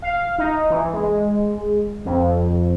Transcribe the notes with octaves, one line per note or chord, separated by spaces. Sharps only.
F5
D#4
E3
G#3
F2